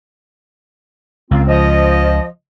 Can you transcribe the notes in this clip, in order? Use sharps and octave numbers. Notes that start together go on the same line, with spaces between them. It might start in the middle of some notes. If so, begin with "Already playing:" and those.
C#2 A#3 C4 F4
F3 D#5